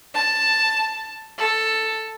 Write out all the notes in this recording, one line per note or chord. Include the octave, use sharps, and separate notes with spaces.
A5
A4